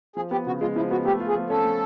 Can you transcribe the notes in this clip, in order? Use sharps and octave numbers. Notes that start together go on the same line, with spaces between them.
F3 G#4
B3 G4
C#3 F#4
G#3 F4
F3 E4
B3 F#4
A3 G4
F4
G#4
F3
C#4 A4
A3